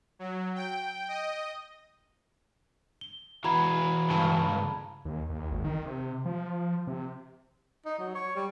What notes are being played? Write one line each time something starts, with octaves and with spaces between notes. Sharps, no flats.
F#3
G5
D#5
G7
E3 E4 F#4 A#5 B5 G#6
C#2 G2 A5
D#2
D#2
G#1
D#3
C3
F3
C3
D#4
F#3
C#5
G3